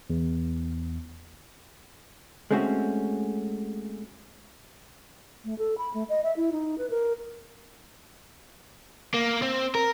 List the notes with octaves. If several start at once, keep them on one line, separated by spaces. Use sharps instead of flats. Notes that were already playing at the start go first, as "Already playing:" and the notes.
E2
G#3 A3 C4 C#4 F#4
A3
A4
B5
A3
D#5
E5
E4
D#4
B4
A#4
A#3
C4
A#4